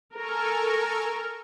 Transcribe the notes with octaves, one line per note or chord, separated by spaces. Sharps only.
A4 A#4 G#5 C#6